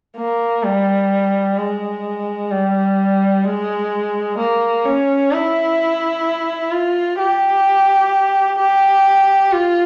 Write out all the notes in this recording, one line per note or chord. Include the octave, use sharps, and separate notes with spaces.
A#3
G3
G#3
G3
G#3
A#3
C#4
E4
F4
G4
G4
F4